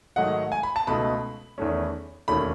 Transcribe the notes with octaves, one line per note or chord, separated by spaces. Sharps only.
G#2 D#3 F#3 A3 D#4 F#5
G#5
B5
A5
C#2 B2 A3 D#4 B5
E2 D#3 A3 C#4
E1 D#2 D#3 A3 C#4 B5